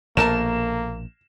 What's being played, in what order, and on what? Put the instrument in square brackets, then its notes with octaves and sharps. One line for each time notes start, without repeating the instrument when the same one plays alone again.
[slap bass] A#1 B2 [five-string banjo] A3 A#4 A5 [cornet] A#3 [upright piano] E7